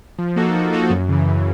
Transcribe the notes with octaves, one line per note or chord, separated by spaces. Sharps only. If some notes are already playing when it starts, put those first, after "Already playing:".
F3
A#3 D#4 F#4 A4
F3
A#3 D#4 F#4 A4
F#2
C#3 E3
F#2